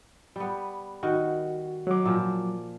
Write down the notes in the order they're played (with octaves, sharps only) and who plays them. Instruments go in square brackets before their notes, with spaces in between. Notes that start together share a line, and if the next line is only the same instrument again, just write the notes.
[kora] G3 B3
[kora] D#3 [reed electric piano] F#4
[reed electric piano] F#3 D6
[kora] A#2 F3